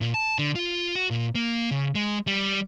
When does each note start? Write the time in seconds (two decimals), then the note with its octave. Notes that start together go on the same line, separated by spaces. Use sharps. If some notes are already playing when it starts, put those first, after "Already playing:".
0.01 A#2
0.14 A5
0.39 D3
0.55 F4
0.95 F#4
1.10 A#2
1.35 A#3
1.71 C#3
1.95 G#3
2.27 G3